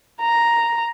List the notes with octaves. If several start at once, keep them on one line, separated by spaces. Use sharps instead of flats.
A#5